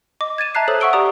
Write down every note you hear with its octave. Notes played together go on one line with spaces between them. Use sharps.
D#5 D6
G#6 A6 D#7 E7
E5 A5 A#5 F#6 C7
A4 C5 C#5 D#6 F#6
E5 F#5 C#6 E6 D7 G7
G4 D5 A#5 D#6